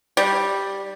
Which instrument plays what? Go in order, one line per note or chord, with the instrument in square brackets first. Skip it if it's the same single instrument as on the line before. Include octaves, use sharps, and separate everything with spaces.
[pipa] G3